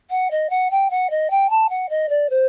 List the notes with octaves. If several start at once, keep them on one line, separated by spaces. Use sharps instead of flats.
F#5
D#5
F#5
G5
F#5
D#5
G5
A5
F#5
D#5
D5
C5